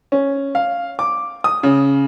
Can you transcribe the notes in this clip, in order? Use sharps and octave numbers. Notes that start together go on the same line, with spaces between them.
C#4
F5
D6
D#6
C#3